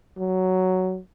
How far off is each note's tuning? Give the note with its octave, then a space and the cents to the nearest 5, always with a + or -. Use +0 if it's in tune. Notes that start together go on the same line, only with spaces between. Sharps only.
F#3 +5